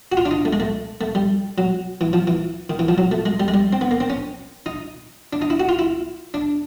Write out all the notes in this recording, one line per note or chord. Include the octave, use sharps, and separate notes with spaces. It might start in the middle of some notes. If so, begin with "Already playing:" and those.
F#4
F4
D4
D#4
A3
G#3
A3
A3
G3
F#3
E3
F3
E3
D#3
E3
F3
F#3
A3
G#3
G3
G#3
G3
C4
B3
A#3
C4
C#4
D#4
D4
D#4
E4
F#4
F4
E4
D4